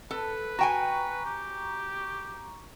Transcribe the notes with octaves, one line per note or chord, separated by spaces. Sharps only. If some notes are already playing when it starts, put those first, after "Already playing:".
A4 B4
F#4 G5 G#5 A#5 C#6
G4